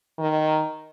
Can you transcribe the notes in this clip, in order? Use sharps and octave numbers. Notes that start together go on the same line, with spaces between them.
D#3